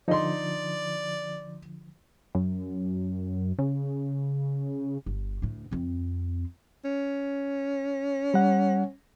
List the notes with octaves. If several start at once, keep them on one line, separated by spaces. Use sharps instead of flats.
D3 F3 D#4 D5 C6
F#2
C#3
G1
D2 A2
F2 C4
C#4
G3 F#5